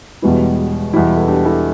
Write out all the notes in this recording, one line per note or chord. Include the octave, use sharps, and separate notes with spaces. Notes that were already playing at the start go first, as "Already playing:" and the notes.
E1 E2 B2 G3 B3 E4
E2 B2 G3 B3 E4
A4
D4 G4
E4 A4